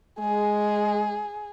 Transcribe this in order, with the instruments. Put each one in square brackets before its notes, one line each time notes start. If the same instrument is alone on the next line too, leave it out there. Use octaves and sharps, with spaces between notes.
[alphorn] G#3 [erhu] G#4